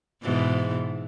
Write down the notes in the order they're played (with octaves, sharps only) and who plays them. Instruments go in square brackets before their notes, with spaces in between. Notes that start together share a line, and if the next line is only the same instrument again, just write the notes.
[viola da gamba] G#2 B2 E3